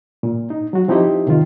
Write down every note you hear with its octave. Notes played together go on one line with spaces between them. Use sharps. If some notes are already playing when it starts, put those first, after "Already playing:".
A#2
D#4
F#3 F#4
F3 C4 D#4 E4 G4 D#5
C3 D#3 F4